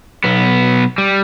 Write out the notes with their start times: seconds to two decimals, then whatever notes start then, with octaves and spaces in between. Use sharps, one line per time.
0.24 B1 B3
0.98 G3